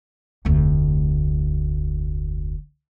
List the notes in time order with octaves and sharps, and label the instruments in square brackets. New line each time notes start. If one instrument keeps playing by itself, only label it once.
[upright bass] F1 D2